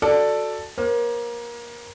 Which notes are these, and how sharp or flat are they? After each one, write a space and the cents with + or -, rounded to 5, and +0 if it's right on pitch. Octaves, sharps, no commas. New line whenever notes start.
F#4 +0 A4 +5 D5 +5
A#3 +25 C5 +35